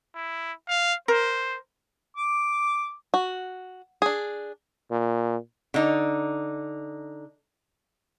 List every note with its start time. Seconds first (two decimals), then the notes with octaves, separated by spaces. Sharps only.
0.15 E4
0.68 F5
1.08 A#4 C5
2.17 D6
3.14 F#4
4.02 D4 G#4
4.91 A#2
5.74 D3 D#4